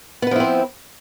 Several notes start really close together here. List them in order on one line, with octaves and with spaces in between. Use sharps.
B3 B4 F3 E4 C4